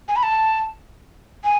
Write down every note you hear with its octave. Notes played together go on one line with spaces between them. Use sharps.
G#5
B5
A5
G#5